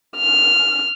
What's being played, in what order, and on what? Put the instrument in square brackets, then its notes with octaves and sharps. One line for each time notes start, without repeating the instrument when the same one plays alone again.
[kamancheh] F6